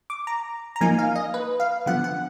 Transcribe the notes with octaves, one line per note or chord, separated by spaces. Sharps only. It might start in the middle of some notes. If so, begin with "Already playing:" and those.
D6
A#5
A#5
F3 A#3 D#4 G#5
F5
D#5
B4
F5
D3 F3 B3 F#5
F#5